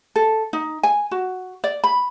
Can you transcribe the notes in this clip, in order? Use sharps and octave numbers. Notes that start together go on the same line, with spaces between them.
A4
D#4
G#5
F#4
D5
B5